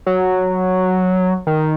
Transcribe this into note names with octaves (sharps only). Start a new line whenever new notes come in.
F#3
D#3